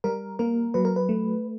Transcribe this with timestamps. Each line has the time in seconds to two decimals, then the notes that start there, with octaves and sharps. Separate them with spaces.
0.04 G3 A#4
0.39 A#3 A#4
0.74 F#3 B4
0.85 A#4
0.96 B4
1.09 A3